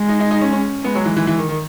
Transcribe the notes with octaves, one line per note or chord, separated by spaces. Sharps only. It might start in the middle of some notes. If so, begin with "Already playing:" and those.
Already playing: G#3
D#4
D#4
D#4
C#4
C#4
G#3 B3
F#3
E3
E3
E3
D#3
D#3